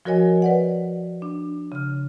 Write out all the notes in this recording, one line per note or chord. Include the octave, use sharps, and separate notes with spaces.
F3 F#4 A#4 C#5 D#5 G#5
B4 D5 F#5
D4
C#3 F6